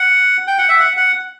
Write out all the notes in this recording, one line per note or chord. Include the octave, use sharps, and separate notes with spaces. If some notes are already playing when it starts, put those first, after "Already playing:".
Already playing: F#5
G5
F#5
E5
F#5
F#5